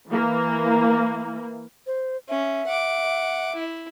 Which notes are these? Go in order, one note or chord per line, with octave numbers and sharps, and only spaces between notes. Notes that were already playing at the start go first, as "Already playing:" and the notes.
E3 A#3
C5
C#4 E5
F#5 D6
E4